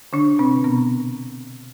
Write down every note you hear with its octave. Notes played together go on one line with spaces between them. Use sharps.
D3 D4
C3 C4
B2 B3